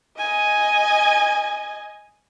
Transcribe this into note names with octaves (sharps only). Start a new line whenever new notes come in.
D#5 G#5